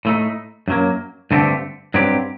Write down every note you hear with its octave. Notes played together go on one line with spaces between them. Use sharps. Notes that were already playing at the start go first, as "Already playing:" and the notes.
A2 A3 D#4
F#2 F#3 A#3
G2 D3 A3 C4 G4
G2 F#3 C4 G4